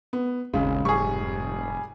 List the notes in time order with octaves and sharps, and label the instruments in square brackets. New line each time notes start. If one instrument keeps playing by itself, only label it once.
[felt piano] B3
[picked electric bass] D#1 G#3 C#4 [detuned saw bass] G#1 [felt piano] C#3
[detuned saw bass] F1 [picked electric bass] G#2 [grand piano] G3 G#4 [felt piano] C#6